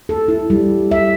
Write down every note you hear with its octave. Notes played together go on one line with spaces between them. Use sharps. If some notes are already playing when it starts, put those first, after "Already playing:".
A4
E4
G3
E5